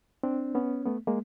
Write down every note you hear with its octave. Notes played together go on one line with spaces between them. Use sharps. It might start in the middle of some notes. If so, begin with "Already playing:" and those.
C4 D4
B3 C#4
A3 B3
G#3 A#3